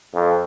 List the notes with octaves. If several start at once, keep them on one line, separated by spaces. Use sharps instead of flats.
F2